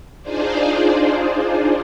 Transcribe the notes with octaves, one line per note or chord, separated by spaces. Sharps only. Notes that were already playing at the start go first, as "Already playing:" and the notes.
D4 D#4 F4 G#4 C5 D5